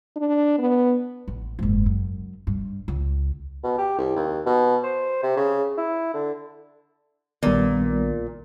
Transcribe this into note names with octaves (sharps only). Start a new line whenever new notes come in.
D4
B3
A1
F#1 G#2
F#2
G2
C#2
B2
G4
C2
D#2
B2
C5
C3
C#3
E4
D3
A#1 A#2 D#3 G3 B3